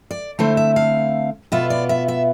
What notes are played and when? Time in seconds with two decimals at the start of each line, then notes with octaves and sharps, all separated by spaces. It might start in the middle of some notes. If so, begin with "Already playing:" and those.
0.11 D5
0.39 D3 A3 C4 E4 C5
0.57 E5
0.76 F5
1.52 B2 B3 F4 E5
1.70 D5
1.89 E5
2.08 E5